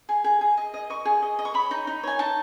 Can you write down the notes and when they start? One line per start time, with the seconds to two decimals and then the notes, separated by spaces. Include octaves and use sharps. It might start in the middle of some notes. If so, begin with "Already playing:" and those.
0.09 G#4
0.24 G#4
0.41 G#4
0.57 D#5
0.74 D#5
0.90 D#5 C#6
1.05 G#4
1.22 D#5
1.39 D#5
1.45 C#6
1.54 C#5 B5
1.71 D#4
1.87 D#4
2.03 C#5 G#5
2.19 D#4 A5